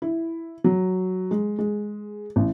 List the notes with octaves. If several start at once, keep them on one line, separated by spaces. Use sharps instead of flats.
E4
F#3
G#3
G#3
A1